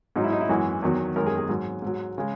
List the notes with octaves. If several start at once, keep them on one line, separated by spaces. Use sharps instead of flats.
G#2 F#3 D#4
E4
D#4
E4
F#2 E3 G#3 F#4
E2 D#3 F#3
F#2 D#3 G#3 A#4
G#4
G#4
G#2 F#3
G#2 F#3
C#3 G#3